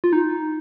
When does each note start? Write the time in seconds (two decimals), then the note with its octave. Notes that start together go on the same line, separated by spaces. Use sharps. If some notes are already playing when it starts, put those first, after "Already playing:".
0.04 F4
0.13 D#4